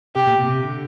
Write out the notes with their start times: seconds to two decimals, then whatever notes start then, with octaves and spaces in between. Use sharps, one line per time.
0.16 C3 G4
0.27 A#2
0.38 C3
0.63 D3